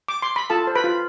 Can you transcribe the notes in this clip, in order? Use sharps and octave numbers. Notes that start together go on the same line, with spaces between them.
D6
C6
B5
F4 A4 A5
C5
B4 B5
F4